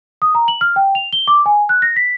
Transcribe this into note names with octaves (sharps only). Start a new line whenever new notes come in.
D#6
A#5
F#7
F6
G5
F7
G7
D6
G#5
F#6
A#6
B6